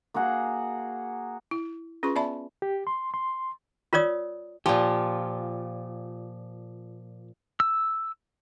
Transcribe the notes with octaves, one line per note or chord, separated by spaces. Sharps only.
A#3 F#4 G#4 F#5
E4
C#4 F4 G#4 B4 C6 C#6
B3 D5 E5 A5 B5
G4
C6
C6
F4 A#4 C#5 D5 D#6
A#2 F3 G4
E6